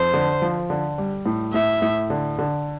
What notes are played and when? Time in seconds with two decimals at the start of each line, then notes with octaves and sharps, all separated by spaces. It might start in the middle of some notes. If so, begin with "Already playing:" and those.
Already playing: F2 C5
0.14 D3
0.42 F3
0.70 D3
0.98 G3
1.26 A2
1.53 A2 E5
1.82 A2
2.10 D3
2.39 D3